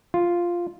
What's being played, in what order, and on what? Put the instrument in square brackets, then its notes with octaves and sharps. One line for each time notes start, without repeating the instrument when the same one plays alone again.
[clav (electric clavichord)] F4